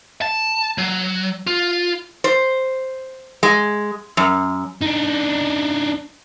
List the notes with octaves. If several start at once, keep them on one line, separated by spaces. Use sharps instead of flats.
A5
F#3
F4
C5
G#3
F#2
D4 D#4